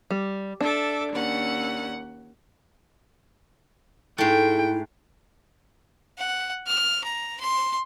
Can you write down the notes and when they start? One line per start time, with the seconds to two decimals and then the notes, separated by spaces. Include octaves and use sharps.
0.11 G3
0.61 D4 A4 E5 D6
1.11 D#2 C#4 F#5
4.18 G#2 A3 E4 G5
6.18 F#5
6.67 F6
7.04 A#5
7.40 C6